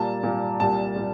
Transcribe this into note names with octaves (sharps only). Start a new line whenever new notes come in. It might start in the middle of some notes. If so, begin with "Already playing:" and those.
Already playing: A#2 G3 A#3 A5
A#2 G3 A#3
C2 A#2 G3 A5
A#2 G3